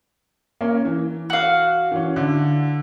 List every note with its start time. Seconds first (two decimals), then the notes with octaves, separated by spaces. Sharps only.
0.61 A#3 C#4
0.85 E3
1.30 F#4 F5
1.92 E3 C#4
2.16 D3 E4